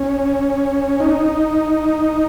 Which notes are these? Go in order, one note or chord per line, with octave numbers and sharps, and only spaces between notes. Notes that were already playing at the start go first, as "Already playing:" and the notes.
Already playing: C#4
D#4